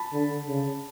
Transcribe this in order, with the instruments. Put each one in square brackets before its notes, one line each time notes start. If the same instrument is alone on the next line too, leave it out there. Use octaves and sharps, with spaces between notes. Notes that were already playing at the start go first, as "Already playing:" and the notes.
Already playing: [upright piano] A5 B5
[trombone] D3
C#3